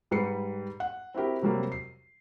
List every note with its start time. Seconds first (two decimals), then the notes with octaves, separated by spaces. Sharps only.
0.11 G#2 G3 B4 C7 C#7
0.80 F#5
1.14 C4 E4 F#4 G4 A#4
1.42 C3 F#3 G3 A#3 C4
1.72 C7